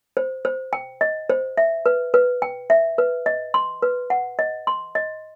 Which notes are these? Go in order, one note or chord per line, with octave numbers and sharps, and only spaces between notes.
C5
C5
G5
D#5
C5
E5
B4
B4
G5
E5
B4
D#5
C6
B4
F#5
D#5
C6
D#5